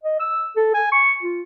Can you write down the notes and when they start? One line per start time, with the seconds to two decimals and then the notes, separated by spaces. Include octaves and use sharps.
0.03 D#5
0.20 E6
0.56 A4
0.74 G#5
0.92 C#6
1.23 F4